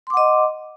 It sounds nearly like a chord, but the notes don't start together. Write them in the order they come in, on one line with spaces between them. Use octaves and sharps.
C6 D6 F#5 D#5